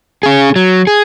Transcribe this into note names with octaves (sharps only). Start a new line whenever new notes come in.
C#4 G#4
F#3
G#4